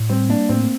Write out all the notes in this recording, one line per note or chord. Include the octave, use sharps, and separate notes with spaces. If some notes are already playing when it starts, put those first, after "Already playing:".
Already playing: A2
G3 C4
A#3 D4
A2 C4